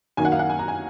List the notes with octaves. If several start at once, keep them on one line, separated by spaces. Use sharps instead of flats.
F#2 D#3 A#3 D#4 G#5
F#5
F5
F#5
G#5
A#5
G#5